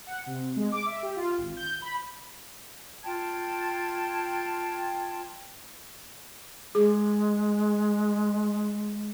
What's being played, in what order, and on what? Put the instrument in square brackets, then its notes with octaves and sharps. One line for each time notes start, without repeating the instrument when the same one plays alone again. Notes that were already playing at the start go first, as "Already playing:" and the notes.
[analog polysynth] F#5
C3
G#3
D6
E5
G4
F4
G#1
G6
B5
[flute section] F4 G5 A5 G#6
[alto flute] G#3 [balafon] G#4